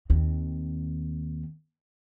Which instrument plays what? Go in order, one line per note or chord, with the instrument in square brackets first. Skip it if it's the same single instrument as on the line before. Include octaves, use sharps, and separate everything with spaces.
[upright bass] D#2 C4